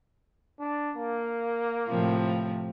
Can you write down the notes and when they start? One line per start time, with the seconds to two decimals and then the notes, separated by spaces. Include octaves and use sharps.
0.60 D4
0.97 A#3
1.89 A2 C3 F3